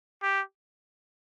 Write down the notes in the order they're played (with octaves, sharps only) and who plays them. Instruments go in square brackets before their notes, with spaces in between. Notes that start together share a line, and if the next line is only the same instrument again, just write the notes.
[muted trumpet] G4